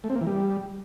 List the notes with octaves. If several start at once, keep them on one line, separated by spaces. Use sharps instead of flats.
A3
C4
A#3
E3
G3